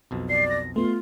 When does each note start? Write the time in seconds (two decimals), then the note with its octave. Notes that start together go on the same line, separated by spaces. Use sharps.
0.11 B1 F2 B2
0.29 D5 C7
0.50 A#6
0.76 A3 B3 F4 C6